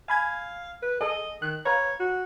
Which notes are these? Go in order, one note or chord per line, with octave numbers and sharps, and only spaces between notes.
F5 G#5 B5 G#6
B4
G#4 A4 D#5
D#3 F#6
B4 C#5 F5 A#5
F#4